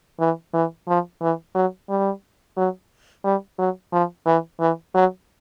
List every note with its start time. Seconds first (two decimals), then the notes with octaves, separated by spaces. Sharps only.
0.20 E3
0.54 E3
0.88 F3
1.22 E3
1.55 F#3
1.90 G3
2.57 F#3
3.24 G3
3.59 F#3
3.93 F3
4.26 E3
4.60 E3
4.95 F#3